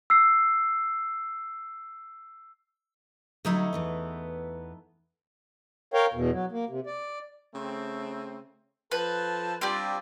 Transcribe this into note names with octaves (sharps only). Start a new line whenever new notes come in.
E6 C7
D3 F#3 G3 A3 D#4 E4
E2 E3 B3
A#4 C#5 F5 G5
E2 B2
F#3
A#3
C3
D5
C#3 A3 C4
F3 A4 B4 A5
G3 C4 D4 F4 G4